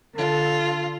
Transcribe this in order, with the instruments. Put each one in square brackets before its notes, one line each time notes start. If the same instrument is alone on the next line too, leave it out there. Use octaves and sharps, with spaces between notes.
[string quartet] D3 F4 [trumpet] A4